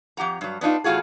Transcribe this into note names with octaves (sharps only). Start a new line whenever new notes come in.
F2 G4 F#5 A#5
G2 F#3
B3 D4 D#4 F4
E2 A2 F4 F#4 G#4